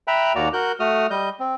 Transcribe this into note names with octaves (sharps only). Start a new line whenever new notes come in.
E5 G5 A#5 B5 F#6
D#2 A#3 F#4 D5 A#5
F#4 A#4 F#6 G6
A3 F#4 D#6 F6
G3 D#5 G6
C4